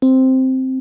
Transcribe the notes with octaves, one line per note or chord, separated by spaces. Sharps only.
C4